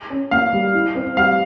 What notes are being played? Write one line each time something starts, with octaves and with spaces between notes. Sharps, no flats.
C#4
A#3 F5
G3
E4
C4
G3 F5